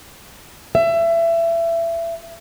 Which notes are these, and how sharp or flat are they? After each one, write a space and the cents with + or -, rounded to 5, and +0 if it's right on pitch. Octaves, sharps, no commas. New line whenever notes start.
E5 +25